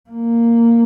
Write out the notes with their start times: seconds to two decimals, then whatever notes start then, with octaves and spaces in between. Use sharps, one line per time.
0.10 A#3